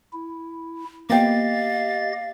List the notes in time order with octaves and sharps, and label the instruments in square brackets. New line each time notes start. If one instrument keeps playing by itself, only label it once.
[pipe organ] E4
[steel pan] A#3 B3 G5 [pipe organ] G4 D#5 A6 [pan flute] F5